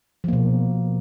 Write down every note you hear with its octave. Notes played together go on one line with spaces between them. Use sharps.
B2 F3 A#3